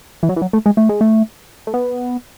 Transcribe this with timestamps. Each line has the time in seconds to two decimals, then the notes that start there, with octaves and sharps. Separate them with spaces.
0.23 E3
0.29 F#3
0.36 E3
0.42 F#3
0.53 A3
0.66 G#3
0.77 A3
0.89 G#3
1.01 A3
1.67 A3
1.74 B3